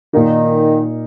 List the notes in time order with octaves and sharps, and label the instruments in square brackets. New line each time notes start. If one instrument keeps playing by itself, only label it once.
[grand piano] A#2 A#3 D#4 [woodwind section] D#3